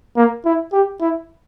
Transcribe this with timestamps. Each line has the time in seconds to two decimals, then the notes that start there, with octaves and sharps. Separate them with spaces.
0.17 A#3
0.45 E4
0.73 G4
1.01 E4